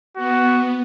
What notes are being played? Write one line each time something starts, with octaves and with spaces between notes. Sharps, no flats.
B3 F#4